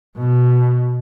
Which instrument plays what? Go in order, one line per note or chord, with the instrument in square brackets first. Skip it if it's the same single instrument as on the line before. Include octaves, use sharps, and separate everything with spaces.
[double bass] B2